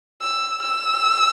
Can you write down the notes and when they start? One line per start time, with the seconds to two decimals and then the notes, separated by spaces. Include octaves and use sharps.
0.21 E6
0.63 E6